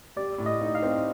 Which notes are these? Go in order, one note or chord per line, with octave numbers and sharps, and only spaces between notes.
G3 D5
A2
D#5
D#4
F5
C4